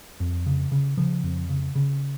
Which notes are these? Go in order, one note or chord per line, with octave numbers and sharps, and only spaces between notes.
F2
C#3
C#3
C#3 F3
F2
C#3
C#3